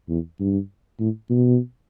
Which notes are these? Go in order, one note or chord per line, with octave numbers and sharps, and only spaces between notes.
E2
G2
A2
B2